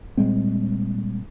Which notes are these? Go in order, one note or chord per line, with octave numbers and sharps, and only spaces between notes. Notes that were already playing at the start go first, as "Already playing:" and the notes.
A#2 G3 G#3 C4